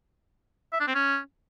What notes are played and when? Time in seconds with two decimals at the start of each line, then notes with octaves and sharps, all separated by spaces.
0.73 E5
0.80 D4
0.87 C4
0.95 C#4